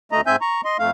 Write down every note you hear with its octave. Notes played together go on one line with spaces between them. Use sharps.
D2 A3 D#5 A#5
G#2 C4 E5 G#5 G6
A#5 C#6
D#5 C6
F2 A3 F5